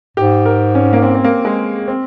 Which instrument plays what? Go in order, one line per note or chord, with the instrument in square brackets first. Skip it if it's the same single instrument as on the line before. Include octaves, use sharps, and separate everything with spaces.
[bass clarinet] G#2 [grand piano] G4
[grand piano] A#4
C#4
A#3
C4
C4
A#3
G#3
C4